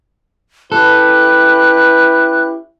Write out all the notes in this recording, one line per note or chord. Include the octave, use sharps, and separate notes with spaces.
C#4 E4 G4 A4 B4 F#6